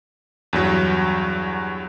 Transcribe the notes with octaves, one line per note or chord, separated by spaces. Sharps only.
E2 G2 F#3